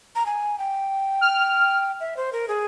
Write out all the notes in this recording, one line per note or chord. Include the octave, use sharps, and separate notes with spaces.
A#5
G#5
G5
F6
E5
C5
A#4
G#4